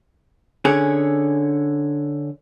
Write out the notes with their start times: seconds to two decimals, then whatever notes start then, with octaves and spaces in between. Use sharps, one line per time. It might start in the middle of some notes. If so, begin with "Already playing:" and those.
0.65 D3 C#4 G#4